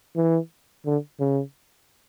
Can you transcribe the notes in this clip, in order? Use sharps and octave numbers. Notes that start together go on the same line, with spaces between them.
E3
D3
C#3